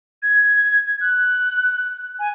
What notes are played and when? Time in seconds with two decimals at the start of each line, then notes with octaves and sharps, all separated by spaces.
0.23 G#6
1.01 F#6
2.19 G#5